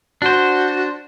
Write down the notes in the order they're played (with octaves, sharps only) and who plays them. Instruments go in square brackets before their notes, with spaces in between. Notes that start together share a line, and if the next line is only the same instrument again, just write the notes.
[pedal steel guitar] D4 C5 [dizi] F#4